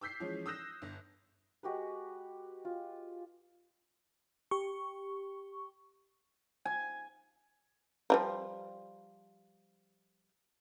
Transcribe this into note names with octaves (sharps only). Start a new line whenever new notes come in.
D6 E6 G6 B6 C7
E3 F3 G#3 C#4
D#6 E6 F#6 G6 A#6 E7
G1
G#3 F#4 G4 B4
F4
G4 C#6
G#5
F3 G3 A#3